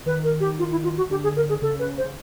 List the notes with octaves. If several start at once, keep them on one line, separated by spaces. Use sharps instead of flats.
D#3 B4
A#4
G4
F4
E4
F4
F#4
D3 G4
G#4
A#4
G#4
C#3 A4
B4
C5
C#3